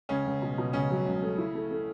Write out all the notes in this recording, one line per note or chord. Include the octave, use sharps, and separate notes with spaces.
C#2 C#3 C#4
C#2
B2
B2
C#2 C#3 C#4
F#3
C#2
A3
E4
A3
A3